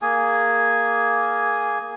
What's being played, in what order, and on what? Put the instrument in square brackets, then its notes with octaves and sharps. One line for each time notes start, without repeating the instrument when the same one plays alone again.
[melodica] A#3 G#4 G#5